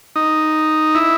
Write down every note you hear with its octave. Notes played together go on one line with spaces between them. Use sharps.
D#4
E4